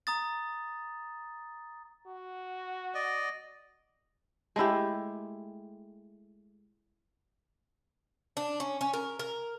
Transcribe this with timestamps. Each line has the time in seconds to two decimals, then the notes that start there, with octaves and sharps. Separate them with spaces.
0.07 A#5 D#6 A6
2.07 F#4
2.94 D5 D#5
4.56 G#3 A3 E4 G4
8.37 D4
8.60 C#4
8.81 C#4
8.93 A#4
9.19 A#4